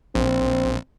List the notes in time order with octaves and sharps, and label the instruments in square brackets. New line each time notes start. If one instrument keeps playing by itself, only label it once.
[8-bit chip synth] A#1 [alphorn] C4